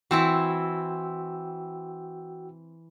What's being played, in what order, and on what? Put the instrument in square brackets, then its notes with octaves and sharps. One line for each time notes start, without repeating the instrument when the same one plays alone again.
[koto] E3 C4 E4 [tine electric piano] F#4 G5 E6